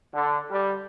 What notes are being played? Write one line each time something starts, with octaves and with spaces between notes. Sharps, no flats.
D3
G3